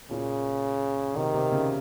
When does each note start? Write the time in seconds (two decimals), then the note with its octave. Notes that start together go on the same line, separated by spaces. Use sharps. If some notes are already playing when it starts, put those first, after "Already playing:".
0.11 A#2 C#3
1.17 C3 D#3
1.34 C3
1.52 C#3